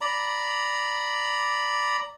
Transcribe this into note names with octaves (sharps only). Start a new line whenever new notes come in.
D5 A#5 B5